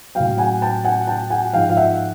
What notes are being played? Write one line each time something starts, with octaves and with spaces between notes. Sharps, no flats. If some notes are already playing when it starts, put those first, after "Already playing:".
A2 F#3 F5 G5
F#5 G#5
G5 A5
F#5 G#5
G5 A5
F#5 G#5
G#2 F3 F5 G5
F5
E5 F#5